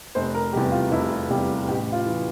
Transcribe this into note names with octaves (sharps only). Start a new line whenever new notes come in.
F1 C5
A#4
E2 C3 G3 G4
F4
F1 E4
E2 C3 G3
A1 G4
F4
E3